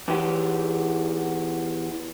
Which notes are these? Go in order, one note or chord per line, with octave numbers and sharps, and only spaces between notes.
E2 E3 G4